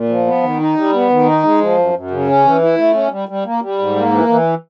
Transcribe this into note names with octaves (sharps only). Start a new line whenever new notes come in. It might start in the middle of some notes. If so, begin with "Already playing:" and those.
Already playing: A#2
F3
B3
D#3
D#4
G3
B3
D#3
D#4
G#3
F3
F#2
F#2
C#3
C#4
E3
E4
A3
C#4
G3
G3
A#3
G3
G#2
A#3
E3
E3